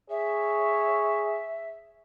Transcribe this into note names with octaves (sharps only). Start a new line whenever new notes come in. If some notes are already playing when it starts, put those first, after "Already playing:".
G#4 C#5 E5